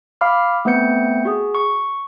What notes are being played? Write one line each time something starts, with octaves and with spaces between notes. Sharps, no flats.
F5 B5 D6 F6
A3 B3 C4 B4 G6 C#7
F#4 G#4
C#6